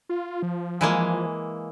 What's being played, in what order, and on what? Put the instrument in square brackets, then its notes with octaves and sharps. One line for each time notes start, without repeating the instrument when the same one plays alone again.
[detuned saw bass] F4
F3
[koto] E3 G#3 A#3